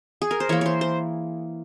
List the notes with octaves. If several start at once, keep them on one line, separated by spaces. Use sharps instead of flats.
G#4
A#4
C5
E3 A#3 C#5
C5 C#5
C5